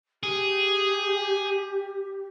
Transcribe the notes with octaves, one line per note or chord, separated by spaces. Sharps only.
G4 G#4